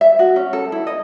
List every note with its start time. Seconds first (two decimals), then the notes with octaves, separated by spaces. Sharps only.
0.01 E5
0.19 F#4
0.36 C#4
0.53 A4
0.72 E4
0.87 D#5